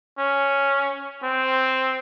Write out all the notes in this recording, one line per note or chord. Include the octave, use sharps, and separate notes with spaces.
C#4
C4